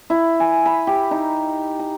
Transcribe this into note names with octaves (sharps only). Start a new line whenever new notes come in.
E4
G#5
B5
G4
D#4
A#5